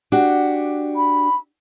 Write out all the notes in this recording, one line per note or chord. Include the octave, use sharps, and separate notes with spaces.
D4 F#4 G4
B5